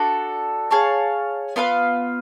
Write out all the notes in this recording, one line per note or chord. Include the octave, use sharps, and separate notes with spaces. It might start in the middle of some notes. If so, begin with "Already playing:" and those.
Already playing: D4 F#4 A4
G#4 C#5 F5 A5
B3 F4 B4 F5